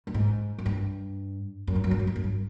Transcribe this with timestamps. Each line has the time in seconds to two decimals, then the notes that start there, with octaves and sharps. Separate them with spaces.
0.07 G2
0.14 G#2
0.59 F#2
0.66 G2
1.67 F#2
1.75 G2
1.84 F#2
1.91 G2
1.99 F#2
2.07 G2
2.16 F#2
2.24 G2